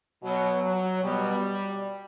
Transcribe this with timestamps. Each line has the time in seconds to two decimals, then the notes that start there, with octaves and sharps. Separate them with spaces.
0.22 B2 F#3
0.62 F#3
1.02 B2 G3